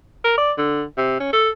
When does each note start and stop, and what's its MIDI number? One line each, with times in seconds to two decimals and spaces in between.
0.24 0.36 70
0.38 0.52 74
0.58 0.83 50
0.97 1.18 48
1.20 1.29 61
1.33 1.50 69